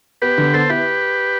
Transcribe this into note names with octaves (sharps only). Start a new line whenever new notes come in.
B3 G4 B4
D3
B3 A4 C5
E4 G4 B4